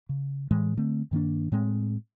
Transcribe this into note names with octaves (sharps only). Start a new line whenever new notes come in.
C#3
A2 E3 G#3
D3 A3 C4
G2 D#3 A#3 D4
A2 G#3 C4